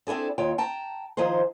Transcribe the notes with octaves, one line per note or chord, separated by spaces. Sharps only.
C4 D4 E4 G#4 A4
D#2 F4 C#5 G5
G5 A5 A#5
D#3 F3 D#4 G#4 C5